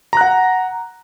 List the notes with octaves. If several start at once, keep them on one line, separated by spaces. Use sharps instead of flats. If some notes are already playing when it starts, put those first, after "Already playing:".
F#5 A#5 F#6